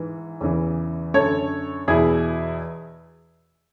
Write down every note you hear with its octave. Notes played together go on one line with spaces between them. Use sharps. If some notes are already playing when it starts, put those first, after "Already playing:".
Already playing: G#2 E3
E2 C#3 E3
F#2 D3 A4 C#5
E2 B2 E4 G#4